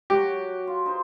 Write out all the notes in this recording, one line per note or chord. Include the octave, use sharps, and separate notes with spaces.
F#3 F#4 G4
F4
D#4 C5